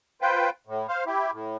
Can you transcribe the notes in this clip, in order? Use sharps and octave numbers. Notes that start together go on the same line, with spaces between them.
F4 B4 C5 G5
A2
C5 F5
E4 G4
A2